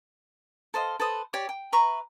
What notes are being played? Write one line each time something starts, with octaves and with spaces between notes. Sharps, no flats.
A4 C5 D#5 F5
A4 B4 C5 D#6
G4 C#5 D5 D6
G5
B4 E5 A#5 C#6